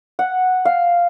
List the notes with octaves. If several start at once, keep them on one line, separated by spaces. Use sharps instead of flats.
F#5
F5